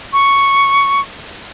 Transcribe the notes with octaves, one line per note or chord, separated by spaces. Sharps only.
C#6